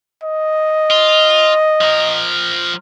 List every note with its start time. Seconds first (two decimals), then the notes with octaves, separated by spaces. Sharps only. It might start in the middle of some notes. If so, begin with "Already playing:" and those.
0.23 D#5
0.91 F4
1.81 F3 A#4